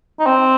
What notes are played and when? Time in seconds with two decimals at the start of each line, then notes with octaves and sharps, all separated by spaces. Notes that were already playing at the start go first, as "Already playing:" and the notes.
0.20 D#4
0.26 C4